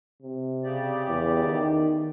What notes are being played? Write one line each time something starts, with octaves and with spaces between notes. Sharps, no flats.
C3
C#3 G4 D5
E2
D#3